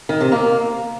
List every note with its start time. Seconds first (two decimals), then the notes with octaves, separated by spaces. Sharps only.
0.09 D#3
0.20 C3
0.32 A#3